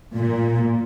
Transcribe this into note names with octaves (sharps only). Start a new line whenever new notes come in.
A#2